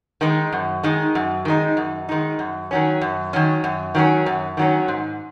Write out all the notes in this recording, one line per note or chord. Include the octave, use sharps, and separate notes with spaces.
D#3 G#3 D#4
F#2
D#3 G#3 D#4
F#2
D#3 G#3 D#4
F#2
D#3 G#3 D#4
F#2
D#3 F#3 C#4
F#2
D#3 F#3 C#4
F#2
D#3 F#3 C#4
F#2
D#3 F#3 C#4
G#2